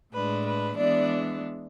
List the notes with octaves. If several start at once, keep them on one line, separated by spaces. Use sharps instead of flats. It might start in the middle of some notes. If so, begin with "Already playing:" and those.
A2 G#3 D4 B4
B4
E3 G#3 B3 D4 D5